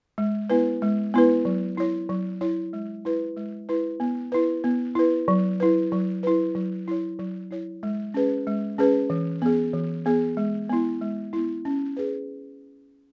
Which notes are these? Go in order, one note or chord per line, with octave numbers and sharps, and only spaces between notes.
G#3
B3 E4 B4
G#3
B3 E4 B4
F#3
E4 C#5
F#3
E4 C#5
G#3
E4 B4
G#3
E4 B4
B3
E4 B4
B3
E4 B4
F#3
E4 B4
F#3
E4 B4
F#3
E4 C#5
F#3
E4 C#5
G#3
C#4 G#4 B4
G#3
C#4 G#4 B4
E3
B3 G#4
E3
B3 G#4
G#3
B3 E4
G#3
B3 E4
C#4
G#4 B4